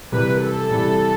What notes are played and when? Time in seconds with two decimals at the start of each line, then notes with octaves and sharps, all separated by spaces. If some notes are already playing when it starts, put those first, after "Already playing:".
0.12 C3 E3 G3 B4
0.42 A4
0.71 C3 E3 G3